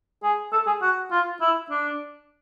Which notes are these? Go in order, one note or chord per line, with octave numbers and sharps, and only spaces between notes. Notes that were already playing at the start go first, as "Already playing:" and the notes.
G#4
A4
G#4
F#4
F4
E4
D4